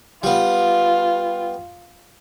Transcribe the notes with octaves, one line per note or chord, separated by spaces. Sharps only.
G3 B3 F4